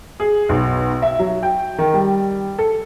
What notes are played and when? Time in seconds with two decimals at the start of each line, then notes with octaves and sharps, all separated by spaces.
0.20 G#4
0.49 B1
1.02 E5
1.19 F#3
1.43 G5
1.78 D#3
1.94 G3
2.59 A4